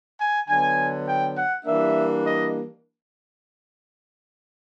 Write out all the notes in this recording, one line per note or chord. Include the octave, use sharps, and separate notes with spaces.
G#5
D3 F#3 B3 D4 G#5
G5
F#5
E3 G3 A#3 D4 E5
D#5